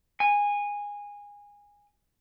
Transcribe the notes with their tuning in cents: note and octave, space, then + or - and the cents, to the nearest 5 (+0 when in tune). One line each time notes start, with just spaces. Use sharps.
G#5 -20